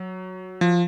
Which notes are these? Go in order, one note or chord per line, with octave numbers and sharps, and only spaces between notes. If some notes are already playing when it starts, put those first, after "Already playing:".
Already playing: F#3
F3